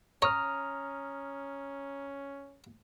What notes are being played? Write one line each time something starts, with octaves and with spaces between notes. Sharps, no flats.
C#4 C#5 A#5 D#6 F6